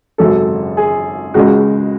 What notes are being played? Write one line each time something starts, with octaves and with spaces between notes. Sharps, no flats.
G#1 F#2 C#3 F#3 A4
G#4
C#2 C#3 G#3 F#4